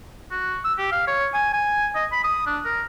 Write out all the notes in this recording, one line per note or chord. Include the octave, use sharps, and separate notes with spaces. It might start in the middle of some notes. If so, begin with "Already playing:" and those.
F#4
E6
G4
F5
C#5
G#5
G#5
D#5
B5
D#6
D4
A#4